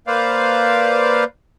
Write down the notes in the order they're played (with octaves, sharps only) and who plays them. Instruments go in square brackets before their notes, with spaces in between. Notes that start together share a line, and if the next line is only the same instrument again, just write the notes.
[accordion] A#3 B4 C5 D5 F5